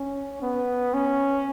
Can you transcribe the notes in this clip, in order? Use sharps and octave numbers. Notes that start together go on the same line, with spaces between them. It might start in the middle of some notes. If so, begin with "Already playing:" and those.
Already playing: C#4
B3
C#4